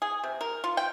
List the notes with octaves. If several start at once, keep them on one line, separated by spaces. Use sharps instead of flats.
G#4
C3
A#4
F4
G5